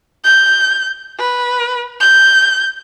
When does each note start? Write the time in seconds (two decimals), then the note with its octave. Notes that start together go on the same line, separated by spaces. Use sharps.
0.24 G6
1.19 B4
2.00 G6